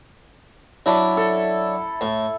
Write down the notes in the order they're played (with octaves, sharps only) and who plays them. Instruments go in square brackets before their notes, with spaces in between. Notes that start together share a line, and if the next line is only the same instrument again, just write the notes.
[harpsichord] F#3 D4 [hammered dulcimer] E4
[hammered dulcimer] A4
[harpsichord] A2